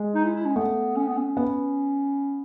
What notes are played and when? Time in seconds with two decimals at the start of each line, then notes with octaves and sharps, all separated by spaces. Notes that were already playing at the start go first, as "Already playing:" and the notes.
Already playing: G#3
0.15 D#4
0.24 E4
0.36 E4
0.45 C#4
0.56 A3 B3
0.96 C#4
1.07 B3
1.17 C#4
1.37 B3